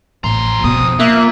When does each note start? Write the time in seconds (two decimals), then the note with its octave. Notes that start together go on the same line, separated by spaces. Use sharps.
0.24 A1 F2 A#5 C6
0.64 B2 B3 D#6
1.00 A#3 F4 E5 F#6